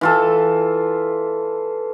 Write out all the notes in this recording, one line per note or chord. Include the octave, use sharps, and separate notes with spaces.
E3 F4 A4